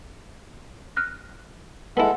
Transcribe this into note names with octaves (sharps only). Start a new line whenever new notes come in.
F6 F#6 A#6
G#3 B3 E4 A4 F#5